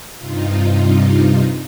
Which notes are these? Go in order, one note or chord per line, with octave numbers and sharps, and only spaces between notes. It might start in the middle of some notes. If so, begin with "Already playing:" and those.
G2 C3 D#4 F4